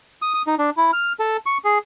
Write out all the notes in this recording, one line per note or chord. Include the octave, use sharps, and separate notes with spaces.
D#6
D#6
D#4
D4
E4
F6
A4
C#6
G#4